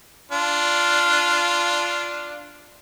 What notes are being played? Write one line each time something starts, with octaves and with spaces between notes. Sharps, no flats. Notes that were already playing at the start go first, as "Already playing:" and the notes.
D4 F4